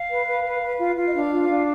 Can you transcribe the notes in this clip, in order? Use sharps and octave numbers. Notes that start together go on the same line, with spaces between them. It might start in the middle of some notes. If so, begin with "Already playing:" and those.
Already playing: F5
B4
B4
B4
B4
F4
F4
D#5
D4 F5
F4
D4